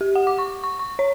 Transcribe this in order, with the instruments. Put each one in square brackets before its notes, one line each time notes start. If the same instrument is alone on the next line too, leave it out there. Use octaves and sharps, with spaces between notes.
[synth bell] G4
F#5
D6
C#6
C#6
C#6
C#5